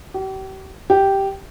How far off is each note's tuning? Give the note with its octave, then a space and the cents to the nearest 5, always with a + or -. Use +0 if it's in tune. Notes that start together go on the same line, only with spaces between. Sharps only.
G4 -40
G4 -5